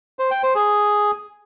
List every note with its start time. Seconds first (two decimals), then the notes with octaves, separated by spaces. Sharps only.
0.19 C5
0.31 G5
0.43 C5
0.55 G#4